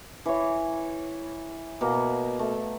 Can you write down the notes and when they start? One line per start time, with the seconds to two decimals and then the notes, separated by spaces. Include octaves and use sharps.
0.26 E3 C#5
1.81 B2 A#3
2.39 A3